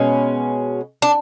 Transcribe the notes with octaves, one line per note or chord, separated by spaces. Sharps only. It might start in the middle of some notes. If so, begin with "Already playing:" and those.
Already playing: B2 G#3 C#4
D4